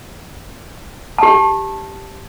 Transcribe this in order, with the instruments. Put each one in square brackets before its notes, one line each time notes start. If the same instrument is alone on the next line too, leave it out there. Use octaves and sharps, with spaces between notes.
[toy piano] G4 A5